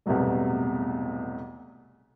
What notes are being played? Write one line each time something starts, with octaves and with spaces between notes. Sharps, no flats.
B1 E2 A2 C3 F#3 G3